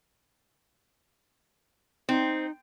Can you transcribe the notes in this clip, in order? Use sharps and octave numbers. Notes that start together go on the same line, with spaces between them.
C4 D#4